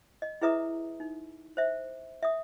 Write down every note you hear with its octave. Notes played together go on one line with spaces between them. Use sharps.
D#5
E4 G#4 B4 E5 A#5 D#6
D#4
C5 E5
E5 D#6